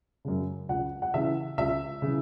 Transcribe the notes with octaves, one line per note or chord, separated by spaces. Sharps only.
F#2 C#3
C#2 F#5
F#5
C#3 E3 E5
C#2 E5
C#3 E3